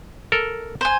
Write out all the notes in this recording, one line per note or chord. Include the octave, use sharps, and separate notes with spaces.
A4 A#4
C5 G#5